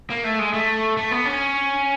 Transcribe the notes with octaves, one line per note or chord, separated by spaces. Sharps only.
A#3
A3
G#3
A3
A3
B3
C#4